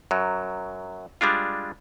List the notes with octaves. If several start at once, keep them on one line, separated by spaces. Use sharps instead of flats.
F#2 F#3
G3 G#3 D4 F4